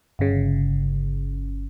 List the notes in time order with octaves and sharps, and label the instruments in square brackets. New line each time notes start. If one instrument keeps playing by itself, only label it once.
[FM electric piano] G1 C#3